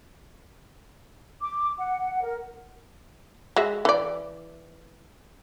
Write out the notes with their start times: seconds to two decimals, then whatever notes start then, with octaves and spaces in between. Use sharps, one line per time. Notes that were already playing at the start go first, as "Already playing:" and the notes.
1.41 D6
1.79 F#5
2.23 A#4
3.56 G#3 F#4 E5
3.85 E3 D5